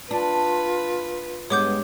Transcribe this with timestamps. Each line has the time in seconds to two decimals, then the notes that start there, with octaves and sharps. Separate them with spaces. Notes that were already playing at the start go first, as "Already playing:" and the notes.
0.11 D4 F4 B4
1.50 G2 G#3 B3 C#5 D6 G6